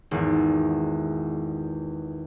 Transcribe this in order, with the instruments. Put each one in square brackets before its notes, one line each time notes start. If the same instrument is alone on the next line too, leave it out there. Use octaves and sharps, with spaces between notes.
[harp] G#1 E2